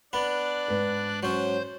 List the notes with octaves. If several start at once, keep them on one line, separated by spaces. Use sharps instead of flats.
B3 D4 D5 B5 F#6
G#2 B4
F#3 C#4 C5 G6